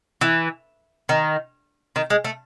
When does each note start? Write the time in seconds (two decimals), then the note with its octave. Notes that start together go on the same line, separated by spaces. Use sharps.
0.21 E3
1.09 D#3
1.96 D#3
2.10 G#3
2.24 A3